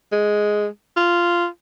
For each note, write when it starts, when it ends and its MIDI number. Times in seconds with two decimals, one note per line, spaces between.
0.12 0.67 56
0.97 1.47 65